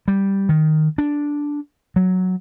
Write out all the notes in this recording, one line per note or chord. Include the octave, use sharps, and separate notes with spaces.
G3
D#3
D4
F#3